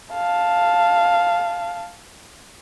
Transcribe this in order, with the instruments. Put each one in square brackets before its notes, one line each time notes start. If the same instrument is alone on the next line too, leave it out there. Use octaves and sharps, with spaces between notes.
[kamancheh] F5 A5